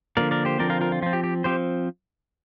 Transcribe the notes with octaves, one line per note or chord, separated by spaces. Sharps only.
D3 F3 A#3 A#4 D5
A#4 D5
G4 C5
D3 F3 C4 A#4 D5
F4 A#4
F4 A#4
F4
F3 C4 F4
G4
G4
F3 C4 G4 C5